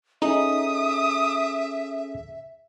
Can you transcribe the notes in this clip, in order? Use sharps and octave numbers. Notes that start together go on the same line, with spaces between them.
C#4 D#4 G#4 A4 E5 D#6